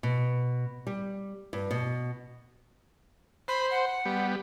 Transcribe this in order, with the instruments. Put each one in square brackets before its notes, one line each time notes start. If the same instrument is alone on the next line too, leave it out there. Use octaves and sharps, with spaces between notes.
[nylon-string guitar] B2
G3
G2
B2
[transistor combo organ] C5 [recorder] B5
[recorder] F#5
[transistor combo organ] G3 B3